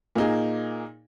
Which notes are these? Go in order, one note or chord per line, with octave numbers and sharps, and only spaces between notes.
A#2 A#3 D#4 G#4